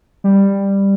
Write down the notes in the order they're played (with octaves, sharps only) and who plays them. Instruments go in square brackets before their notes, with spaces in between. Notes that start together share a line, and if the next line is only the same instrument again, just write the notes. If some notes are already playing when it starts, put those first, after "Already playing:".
[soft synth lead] G3